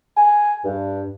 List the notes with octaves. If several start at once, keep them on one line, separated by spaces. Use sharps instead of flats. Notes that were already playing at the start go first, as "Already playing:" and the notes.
G#5
G2